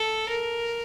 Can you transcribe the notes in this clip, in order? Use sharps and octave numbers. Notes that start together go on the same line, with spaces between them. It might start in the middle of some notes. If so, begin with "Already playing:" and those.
Already playing: A4
A#4